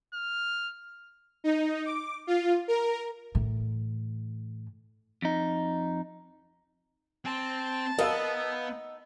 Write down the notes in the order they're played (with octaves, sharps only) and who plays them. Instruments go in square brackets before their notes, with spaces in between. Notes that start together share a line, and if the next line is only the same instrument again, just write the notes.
[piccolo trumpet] F6
[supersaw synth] D#4
D6
F4
A#4
[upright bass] A2 E3
[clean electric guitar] F2 D#4
[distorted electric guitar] C4 [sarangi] A5
[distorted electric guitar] B3 [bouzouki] D#4 [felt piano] A#4 F5 E6